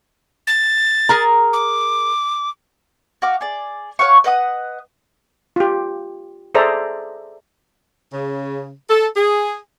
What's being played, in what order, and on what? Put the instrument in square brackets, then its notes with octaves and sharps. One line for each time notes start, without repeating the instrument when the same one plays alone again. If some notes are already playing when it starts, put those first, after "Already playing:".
[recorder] A6
[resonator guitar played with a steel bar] G#4 A#4 A#5
[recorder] D6
[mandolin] F#4 F5 D6
G#4 D5
C#5 F5 F#5 C#6
B4 D#5 F#5 D#6
[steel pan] F4 G4
G#4 A4 C5 D5 E5 A#5
[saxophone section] C#3
A4
G#4